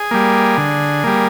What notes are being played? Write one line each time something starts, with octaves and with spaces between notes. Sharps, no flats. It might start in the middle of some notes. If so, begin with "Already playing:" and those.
Already playing: G#4
G3 A#3
D3
G3 A#3